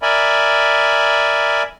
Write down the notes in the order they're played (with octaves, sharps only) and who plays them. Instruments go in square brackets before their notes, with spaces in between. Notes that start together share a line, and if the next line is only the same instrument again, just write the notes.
[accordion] A#4 D5 E5 G#5 B5